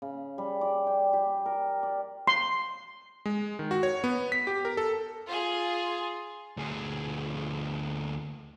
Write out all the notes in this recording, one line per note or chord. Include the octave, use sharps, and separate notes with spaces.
C#3
G3
D5
G5
G4
A#4
D5
C6
G#3
D#3
F#4
C#5
B3
B6
G4
A#4
A4
F4 G#4
D2 G#4